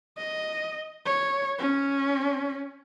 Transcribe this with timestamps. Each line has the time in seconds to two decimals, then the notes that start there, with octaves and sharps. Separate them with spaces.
0.18 D#5
1.06 C#5
1.59 C#4